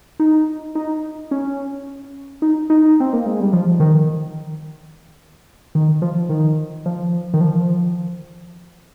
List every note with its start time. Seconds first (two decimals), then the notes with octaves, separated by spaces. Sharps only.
0.20 D#4
0.75 D#4
1.31 C#4
2.42 D#4
2.70 D#4
3.00 C4
3.13 A#3
3.26 G#3
3.40 G3
3.53 F3
3.80 D#3
5.75 D#3
6.02 F3
6.29 D#3
6.86 F3
7.34 D#3
7.41 F3